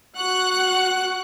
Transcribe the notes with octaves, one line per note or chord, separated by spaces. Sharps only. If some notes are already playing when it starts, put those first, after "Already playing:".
F#4 F#5 C#6 F#6